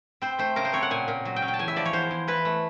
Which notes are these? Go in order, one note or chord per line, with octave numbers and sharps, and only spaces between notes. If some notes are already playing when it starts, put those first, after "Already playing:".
C4 C5
A3 C5
C#3 A#4
C5
C4 C#5
F#5
A#2 G#5
A#2
F#3
G5
C#4
G5
A5
E2 G#5
E5
F3 D5
C#5
E2 C5
E2
E3 B4
A3